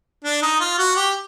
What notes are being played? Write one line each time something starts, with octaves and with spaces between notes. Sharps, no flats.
D4
D#4
F4
F#4
G4